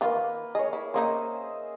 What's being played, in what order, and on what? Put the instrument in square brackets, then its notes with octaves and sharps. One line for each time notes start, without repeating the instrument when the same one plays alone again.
[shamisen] D#3 F4 [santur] A#3 B4
[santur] G#4 C#5 [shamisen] D#5
[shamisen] E4
[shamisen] C#3 A#3 D#4 [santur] C5 D#5 E5